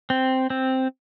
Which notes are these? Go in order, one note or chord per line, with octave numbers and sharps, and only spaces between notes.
C4
C4